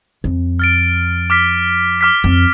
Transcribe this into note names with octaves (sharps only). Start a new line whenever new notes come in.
F2
F6 A6 D7
D6 F6 B6
D6 F6 B6
F2